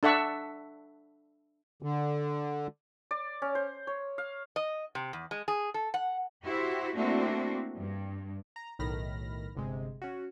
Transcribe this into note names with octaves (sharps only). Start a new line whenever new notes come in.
D4 A4 E5 F#5 C#6
D3
D5
C#4
C5
C#5
F5
D#5
C3
E2
G#3
G#4
A4
F#5
E4 F#4 G4 C5 E5
A3 A#3 C4 D4 E4 F#4
G2
A#5
B1 A2 D#3 B5 F6 A#6
G1 C3 G#3
C#4 F#4